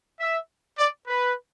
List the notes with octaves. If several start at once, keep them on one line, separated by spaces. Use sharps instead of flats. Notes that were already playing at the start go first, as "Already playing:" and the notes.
E5
D5
B4